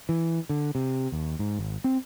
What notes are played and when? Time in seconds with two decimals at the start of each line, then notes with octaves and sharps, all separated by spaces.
0.09 E3
0.49 D3
0.75 C3
1.12 D#2
1.39 G#2
1.59 G#1
1.84 C4